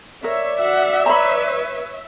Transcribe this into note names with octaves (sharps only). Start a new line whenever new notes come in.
A#4 C#5 D5 E5
F#4 F#5
B4 C#5 A#5 B5